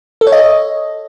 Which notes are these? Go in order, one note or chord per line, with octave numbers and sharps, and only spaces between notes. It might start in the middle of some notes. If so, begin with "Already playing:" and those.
A4
C#5
D#5